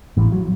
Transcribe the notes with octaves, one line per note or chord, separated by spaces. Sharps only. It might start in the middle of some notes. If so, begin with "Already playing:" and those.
A1 A2 E3
F#3